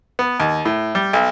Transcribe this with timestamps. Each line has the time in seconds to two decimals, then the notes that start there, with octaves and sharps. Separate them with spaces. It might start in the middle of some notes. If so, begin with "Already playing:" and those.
0.19 B3
0.40 D#2
0.65 A2
0.95 G3
1.13 B1